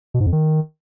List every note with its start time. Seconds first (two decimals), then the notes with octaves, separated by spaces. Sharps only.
0.14 B2
0.20 G#2
0.26 F2
0.32 D#3